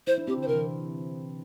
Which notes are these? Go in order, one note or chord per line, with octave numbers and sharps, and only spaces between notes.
E4 C5
D4
C4 G4
D3
C5
C3 A#4
E3